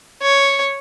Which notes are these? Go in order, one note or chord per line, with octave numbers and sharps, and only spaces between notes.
C#5